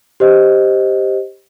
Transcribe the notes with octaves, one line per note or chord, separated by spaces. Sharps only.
G4 C5 D#5